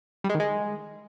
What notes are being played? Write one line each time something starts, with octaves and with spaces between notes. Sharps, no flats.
G3
G#3
D#3
G#3